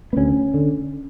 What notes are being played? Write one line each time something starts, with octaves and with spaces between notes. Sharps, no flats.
B3
D2 C#4
D3